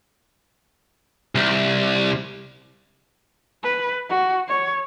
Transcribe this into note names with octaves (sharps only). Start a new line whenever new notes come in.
C2
B4
F#4
C#5